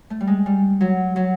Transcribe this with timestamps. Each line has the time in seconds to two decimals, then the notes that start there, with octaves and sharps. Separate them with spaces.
0.10 A3
0.21 G3
0.27 G#3
0.46 G3
0.81 F#3
1.16 F#3